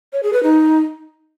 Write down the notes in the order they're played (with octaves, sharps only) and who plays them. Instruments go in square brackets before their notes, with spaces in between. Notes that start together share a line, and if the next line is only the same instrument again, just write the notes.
[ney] C#5
G#4
B4
D#4